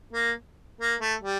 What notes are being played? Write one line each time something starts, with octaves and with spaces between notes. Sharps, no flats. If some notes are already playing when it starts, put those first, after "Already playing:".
A#3
A#3
A3
G3